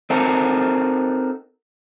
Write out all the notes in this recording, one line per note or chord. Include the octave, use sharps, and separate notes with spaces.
C4 D#4 F#4 A4 A#4